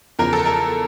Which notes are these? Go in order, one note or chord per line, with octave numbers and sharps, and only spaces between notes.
E2 C#3 F3 A#4
A4
A#4